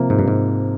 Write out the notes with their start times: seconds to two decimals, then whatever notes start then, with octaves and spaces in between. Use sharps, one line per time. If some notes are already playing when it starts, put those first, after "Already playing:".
Already playing: C3 F3 A#3
0.10 G#2
0.19 G2
0.28 G#2